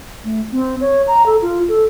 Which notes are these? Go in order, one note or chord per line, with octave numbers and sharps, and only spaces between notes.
A3
C4
C#5
A#5
A4
F4
A4